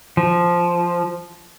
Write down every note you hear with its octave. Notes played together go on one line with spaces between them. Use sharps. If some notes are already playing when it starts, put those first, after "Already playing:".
F3